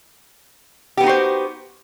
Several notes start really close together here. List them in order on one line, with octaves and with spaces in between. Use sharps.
G4 B3 D#4 F#4 C5